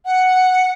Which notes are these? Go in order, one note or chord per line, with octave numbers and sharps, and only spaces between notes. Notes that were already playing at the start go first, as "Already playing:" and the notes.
F#5